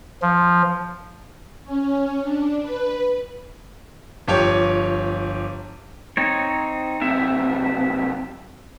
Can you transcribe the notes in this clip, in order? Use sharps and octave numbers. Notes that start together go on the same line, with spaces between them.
F3
C#4
D4
B4
G1 F3 G4 C#5
C4 D#4 C#5
B1 C3 E5